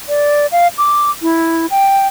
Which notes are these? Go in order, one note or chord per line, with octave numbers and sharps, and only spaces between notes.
D5
F5
D6
E4
G5